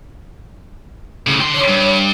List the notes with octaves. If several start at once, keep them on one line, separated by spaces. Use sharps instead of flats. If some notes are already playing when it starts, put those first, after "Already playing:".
A2 C#3
D3 C6
C#5
G2